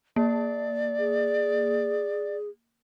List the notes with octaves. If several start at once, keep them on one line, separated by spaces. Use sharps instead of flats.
A#3 D5
G#4